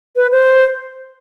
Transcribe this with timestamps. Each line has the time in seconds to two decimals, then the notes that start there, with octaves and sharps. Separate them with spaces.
0.16 B4
0.32 C5